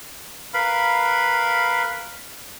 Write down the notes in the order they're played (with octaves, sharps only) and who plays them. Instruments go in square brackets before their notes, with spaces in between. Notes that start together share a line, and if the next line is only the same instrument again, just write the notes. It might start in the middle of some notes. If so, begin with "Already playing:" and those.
[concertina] A#4 B4 F5 B5